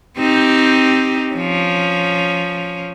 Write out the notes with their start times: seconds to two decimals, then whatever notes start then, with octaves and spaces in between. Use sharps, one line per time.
0.17 C4 D#4 G4
1.33 F3 C#4